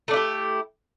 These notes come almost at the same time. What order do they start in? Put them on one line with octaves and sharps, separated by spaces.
A3 D4 E4 G4